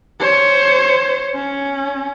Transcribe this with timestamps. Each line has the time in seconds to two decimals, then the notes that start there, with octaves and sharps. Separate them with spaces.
0.20 C5 C#5
1.35 C#4